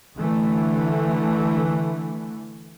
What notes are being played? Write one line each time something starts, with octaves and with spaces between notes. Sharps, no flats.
D3 E3 A3